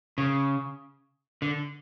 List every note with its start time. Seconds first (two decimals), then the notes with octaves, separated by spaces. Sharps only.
0.18 C#3
1.42 D3